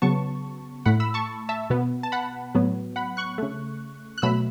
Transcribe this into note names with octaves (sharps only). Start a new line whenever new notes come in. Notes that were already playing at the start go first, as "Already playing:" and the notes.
C#3 F#3 B3 A5 C#6
A2 A3 F#5 B5
B5 E6
A5 C#6
E5 A5
B2 B3
A5
F#5 B5
A2 F#3 B3
F#5 B5
C#6 F#6
C#3 A3
F#6
B2 F#3 A3 B5 E6